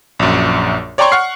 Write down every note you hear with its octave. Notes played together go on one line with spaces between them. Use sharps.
A#1 F#2
C#5 D5 G5 A#5 C6 C#6
F#5 C#6 F6 C7